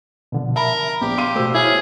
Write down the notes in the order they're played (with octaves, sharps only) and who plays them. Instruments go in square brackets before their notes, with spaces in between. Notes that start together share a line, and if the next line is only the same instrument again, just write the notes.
[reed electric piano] B2 D3 F3
[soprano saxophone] A#4 [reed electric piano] E5 [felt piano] A5 B5
[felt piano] A#1 [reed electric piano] B3 [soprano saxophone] G4
[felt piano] F5 C6 D#7
[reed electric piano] B2 A3 [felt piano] F#4 C5 E6
[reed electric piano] E4 C#5 F6 [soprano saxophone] G#4